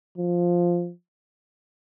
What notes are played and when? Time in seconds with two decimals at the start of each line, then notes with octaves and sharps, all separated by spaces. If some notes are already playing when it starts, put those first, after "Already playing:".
0.18 F3